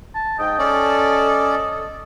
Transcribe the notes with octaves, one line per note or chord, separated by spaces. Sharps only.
A5
G#2 D#5 G5
C#4 A4 D5